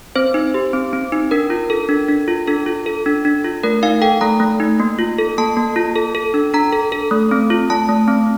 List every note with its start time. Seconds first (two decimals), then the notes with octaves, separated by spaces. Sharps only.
0.16 C4 C5
0.34 D#4
0.54 G4
0.73 C4
0.93 C4
1.12 D#4
1.31 D4 A#4
1.50 F4
1.70 A4
1.89 D4
2.09 D4
2.28 F4
2.48 D4 A4
2.66 F4
2.86 A4
3.06 D4
3.25 D4
3.44 F4
3.63 A3 A#4
3.83 D#4 F5
4.01 A4 G5
4.21 A3 A#5
4.40 A3
4.60 D#4
4.80 A#3
4.99 F4
5.18 A4
5.38 A#3 A5
5.57 A#3
5.76 F4
5.96 A4
6.15 A4
6.34 D4
6.54 D4 A#5
6.73 A4
6.92 A4
7.11 A3
7.31 C4
7.50 F4
7.70 A3 A5
7.89 A3
8.08 C4